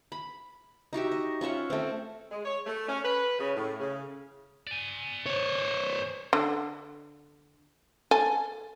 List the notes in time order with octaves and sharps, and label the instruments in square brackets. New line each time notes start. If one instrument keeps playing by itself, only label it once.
[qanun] B5
D#4 F#4 G4 E5
D#5
C#4 F4 E5 F#5
A3 C4
[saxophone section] G#3
C#5
A3
C#4
B4
C#3
A2
C#3
[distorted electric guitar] D5 G#5
[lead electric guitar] C5 C#5
[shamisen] D3
A4 G#5